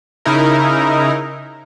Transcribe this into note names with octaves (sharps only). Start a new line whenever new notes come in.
C#3 D#4 E4 A#4